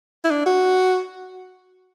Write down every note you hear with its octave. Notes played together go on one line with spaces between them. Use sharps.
E4
D4
F#4